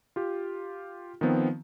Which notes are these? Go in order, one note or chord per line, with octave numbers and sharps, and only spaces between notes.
F4 G4
D#3 F3 B3 C4